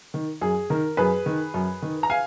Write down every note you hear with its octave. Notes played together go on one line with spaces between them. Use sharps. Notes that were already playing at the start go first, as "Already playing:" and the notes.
D#3
F#2 G#4
D#3 A#4
F#2 G#4 B4
D#3
F#2
D#3
A#5
F5 G#5